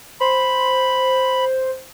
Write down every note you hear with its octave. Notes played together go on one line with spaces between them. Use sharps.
C5 B5